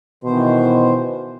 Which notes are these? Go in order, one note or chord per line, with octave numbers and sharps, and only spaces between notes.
B2 D#3 E3 C5